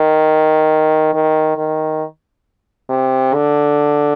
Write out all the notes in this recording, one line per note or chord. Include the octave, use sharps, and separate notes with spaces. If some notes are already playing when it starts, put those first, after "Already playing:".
Already playing: D#3
D#3
D#3
C3
D3